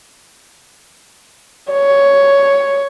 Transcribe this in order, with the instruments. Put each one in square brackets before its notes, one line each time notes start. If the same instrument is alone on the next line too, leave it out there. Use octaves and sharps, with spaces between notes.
[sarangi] C#5